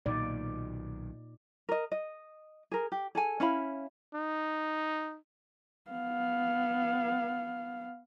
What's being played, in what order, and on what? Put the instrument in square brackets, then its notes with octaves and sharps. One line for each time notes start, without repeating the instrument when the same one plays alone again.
[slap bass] B1 D#3 [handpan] A#2 D#4 D5
[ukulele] A#4 D#5
D#5
G#4 A#4
G4
G#4 A4 G#5
C#4 E4 F5 B5
[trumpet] D#4
[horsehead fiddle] B3 F5